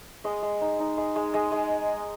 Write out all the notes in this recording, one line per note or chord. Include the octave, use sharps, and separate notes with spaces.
G#3 D#5
G#3
D#4
D#4
G#3
G#3
G#3 D#5
G#3